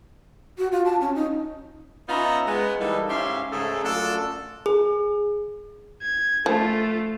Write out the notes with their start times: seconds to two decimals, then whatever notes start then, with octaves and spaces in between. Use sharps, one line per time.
0.58 F#4
0.72 F4
0.85 A5
1.01 C#4
1.15 D#4
2.09 B3 C#4 D#4 F4 E5 A#5
2.47 G#3 B3
2.79 E3 G3 A#3 D#4 A4
3.09 G#2 C#4 G4 E5 F5 C6
3.52 G#2 C#3 A3 G#4 A4
3.84 F#2 A3 D4 F4 A4
4.66 G#4
6.02 G#6
6.46 F3 A3 F4